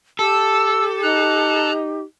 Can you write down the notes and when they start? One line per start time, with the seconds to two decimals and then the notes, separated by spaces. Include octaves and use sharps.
0.19 G4 A4 E6
1.02 D#4 A#5 F#6